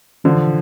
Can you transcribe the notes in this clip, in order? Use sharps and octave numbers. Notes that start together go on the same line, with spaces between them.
D3 E3 F3